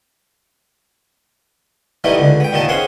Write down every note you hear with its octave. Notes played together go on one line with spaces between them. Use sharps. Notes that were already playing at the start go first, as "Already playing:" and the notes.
E3 G3 A3 B3 D#4
C#2 D3
B3 G5
D#2 A#2 B3 D#4 A5
C4 C#4 G#4 F#5 C6